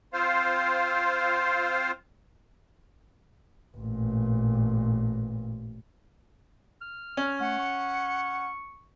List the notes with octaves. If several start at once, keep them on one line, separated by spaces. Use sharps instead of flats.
C4 F4 C5 F5
A1 A#2
F6
C#4
A3 F#5
C#6